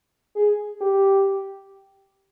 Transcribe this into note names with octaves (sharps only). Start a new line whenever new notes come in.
G#4
G4